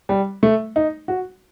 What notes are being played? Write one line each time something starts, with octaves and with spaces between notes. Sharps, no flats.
G3
A3
D#4
F#4